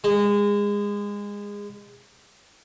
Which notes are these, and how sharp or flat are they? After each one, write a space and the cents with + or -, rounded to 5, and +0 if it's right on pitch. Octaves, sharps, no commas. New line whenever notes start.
G#3 -25